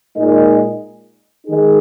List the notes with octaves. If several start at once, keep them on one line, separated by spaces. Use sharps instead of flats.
A#2 G#3 D#4 A#4 D#5
D#3 G#3 D#4 G#4